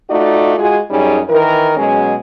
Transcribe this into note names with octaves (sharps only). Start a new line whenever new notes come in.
A3 D#4 F4 F#4 D5
G#3 F4 F#4 G#4
F#2 G3 C#4 D#4 G#4
D#3 E3 A#4
B2 F#3 G#3 C#4 G#4